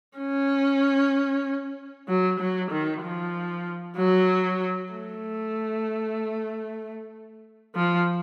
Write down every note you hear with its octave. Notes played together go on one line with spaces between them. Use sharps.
C#4
F#3
F#3
D#3
F3
F#3
A3
F3